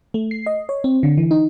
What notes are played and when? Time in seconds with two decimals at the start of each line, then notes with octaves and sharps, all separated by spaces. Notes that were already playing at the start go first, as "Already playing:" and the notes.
0.14 A3
0.31 C7
0.46 D#5
0.69 C#5
0.84 C4
1.03 D3
1.17 E3
1.31 D#4